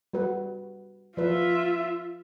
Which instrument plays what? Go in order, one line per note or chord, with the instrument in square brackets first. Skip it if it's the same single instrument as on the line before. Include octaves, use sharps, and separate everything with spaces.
[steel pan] G3 F#4 B4
[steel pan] F3 B4 [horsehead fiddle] F4 E5